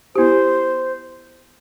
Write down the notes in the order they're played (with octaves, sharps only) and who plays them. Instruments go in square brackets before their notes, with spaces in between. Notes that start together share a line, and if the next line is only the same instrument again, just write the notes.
[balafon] B3 E4 G4 [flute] C5